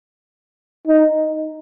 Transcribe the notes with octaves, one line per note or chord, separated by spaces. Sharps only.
D#4